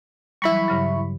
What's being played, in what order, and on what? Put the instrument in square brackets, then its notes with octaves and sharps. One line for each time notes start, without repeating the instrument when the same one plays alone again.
[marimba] E3 F#3 G3 [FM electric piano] E4 B5 C#6
[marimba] G2 C#3 F#3